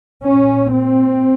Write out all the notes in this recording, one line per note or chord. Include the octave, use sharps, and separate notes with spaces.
A#2 C#4
C4